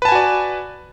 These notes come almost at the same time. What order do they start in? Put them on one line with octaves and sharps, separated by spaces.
B4 A5 G#5 F#4 D5